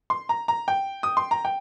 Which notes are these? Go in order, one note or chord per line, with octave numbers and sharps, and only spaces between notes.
C6
A#5
A#5
G5
D#6
C6
A#5
G5